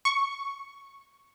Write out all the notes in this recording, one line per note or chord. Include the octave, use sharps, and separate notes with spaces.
C#6